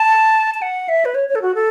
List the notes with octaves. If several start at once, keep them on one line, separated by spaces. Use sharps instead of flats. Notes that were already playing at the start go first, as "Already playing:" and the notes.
Already playing: A5
A5
F#5
E5
B4
C#5
C#5
A4
F#4
A4